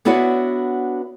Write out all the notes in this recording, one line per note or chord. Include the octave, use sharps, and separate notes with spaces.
B3 D4 E4 F#4 B4 C#5